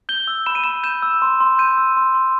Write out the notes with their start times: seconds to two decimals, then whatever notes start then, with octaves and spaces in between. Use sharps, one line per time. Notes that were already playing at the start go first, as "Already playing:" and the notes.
0.09 G6 G7
0.28 E6
0.46 B5 E7
0.55 D#7
0.64 B5 E7
0.83 G6 E7
1.02 E6
1.22 C6
1.40 C6
1.59 G6 D#7
1.78 E6
1.97 C6
2.15 C6